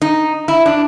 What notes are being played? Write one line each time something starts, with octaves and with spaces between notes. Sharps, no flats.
D#4
E4
D4